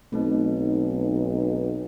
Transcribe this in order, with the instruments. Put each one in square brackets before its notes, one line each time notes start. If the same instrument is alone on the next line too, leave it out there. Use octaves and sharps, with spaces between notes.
[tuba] B1 [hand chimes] A3 C4 D#4